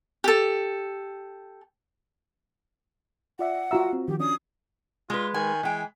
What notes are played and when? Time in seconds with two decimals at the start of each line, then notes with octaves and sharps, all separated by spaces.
0.24 G4 A4
3.39 F4 D5 E5 F#5
3.71 F4 F#4 E5 A#5 E6
3.93 C4
4.08 D#3 F3 G4
4.20 C#4 D4 D#6
5.10 G#3 F4 B4
5.34 D#3 G#5
5.63 E3 G#3 G5